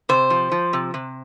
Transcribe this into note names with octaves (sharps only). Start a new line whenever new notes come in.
C3 C5
F3
F3
C3
C3